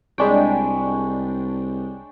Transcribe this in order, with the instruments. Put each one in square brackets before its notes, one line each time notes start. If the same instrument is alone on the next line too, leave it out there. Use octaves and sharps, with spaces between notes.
[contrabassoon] C2 [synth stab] G#3 D4 G5 [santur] C#5 G#5 B5